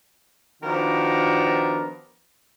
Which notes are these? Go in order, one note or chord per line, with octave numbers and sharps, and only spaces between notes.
D#3 F3 B3 D4 F#4 A#4